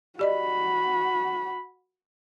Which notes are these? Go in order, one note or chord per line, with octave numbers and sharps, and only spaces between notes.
F#4 G4 D5 D#5 B5